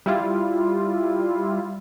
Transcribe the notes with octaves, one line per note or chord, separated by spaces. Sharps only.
G3 E4 F4